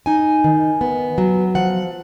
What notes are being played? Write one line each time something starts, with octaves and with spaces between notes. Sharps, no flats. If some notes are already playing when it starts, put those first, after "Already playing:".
D#4 G#5
D#3
B3
F#3
F3 F#5